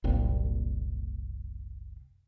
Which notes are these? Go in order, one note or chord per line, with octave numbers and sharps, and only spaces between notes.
F#1 C2 A#2 C4